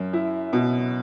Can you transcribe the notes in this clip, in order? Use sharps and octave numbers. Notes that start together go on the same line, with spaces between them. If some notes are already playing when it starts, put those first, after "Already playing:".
Already playing: F#2
E4
B2